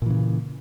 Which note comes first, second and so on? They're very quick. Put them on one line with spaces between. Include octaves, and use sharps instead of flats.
A#2 E3 C#3